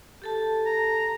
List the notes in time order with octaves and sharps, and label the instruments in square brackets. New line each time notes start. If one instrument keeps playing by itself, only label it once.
[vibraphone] G4 A4 A5
[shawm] A#5